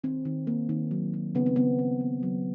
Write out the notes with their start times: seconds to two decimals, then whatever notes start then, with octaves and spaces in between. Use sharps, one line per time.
0.04 D#3 C4
0.25 D#3
0.47 A#3
0.69 D#3
0.91 F#3
1.14 F#3
1.35 C#3 B3
1.46 C4
1.56 C#3 B3
1.79 C#3
2.01 A#3
2.23 F#3